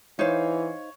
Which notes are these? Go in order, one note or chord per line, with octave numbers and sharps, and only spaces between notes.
E3 D#4 C5 C#5 F5